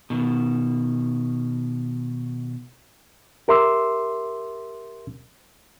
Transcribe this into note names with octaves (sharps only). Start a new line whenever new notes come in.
B2 D#3
G4 A#4 E5 C6 D6 E6